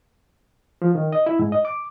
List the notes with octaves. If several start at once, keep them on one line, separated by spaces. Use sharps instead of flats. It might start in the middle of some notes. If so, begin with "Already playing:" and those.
F3
D#3
D#5
E4
G#2
D#5
D6